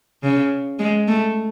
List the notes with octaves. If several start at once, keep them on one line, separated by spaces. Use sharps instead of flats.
C#3
G#3
A3